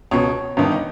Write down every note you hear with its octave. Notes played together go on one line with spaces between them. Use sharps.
C#2 B2 C#5
G1 G2 D#3
D#5